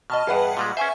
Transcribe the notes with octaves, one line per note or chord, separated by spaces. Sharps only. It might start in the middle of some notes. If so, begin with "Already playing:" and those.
B2 D#5 A5 F6
E2 G2 G#4 B4 F#5
A#2 G3 G#3
C#4 C5 E5 G#5 C#6